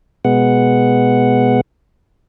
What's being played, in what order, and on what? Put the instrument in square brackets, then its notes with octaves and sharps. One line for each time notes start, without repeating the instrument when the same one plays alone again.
[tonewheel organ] B2 G#3 B3 F#5